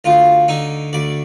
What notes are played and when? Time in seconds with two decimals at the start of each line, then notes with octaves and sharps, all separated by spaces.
0.04 D2 F4
0.48 D3 D#4
0.93 D2 D5